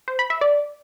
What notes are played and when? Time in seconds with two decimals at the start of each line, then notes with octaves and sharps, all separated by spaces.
0.08 C5
0.19 B5
0.30 E5
0.41 D5